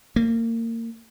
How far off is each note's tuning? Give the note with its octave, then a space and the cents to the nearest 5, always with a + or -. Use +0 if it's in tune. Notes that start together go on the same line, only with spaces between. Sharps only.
A#3 -30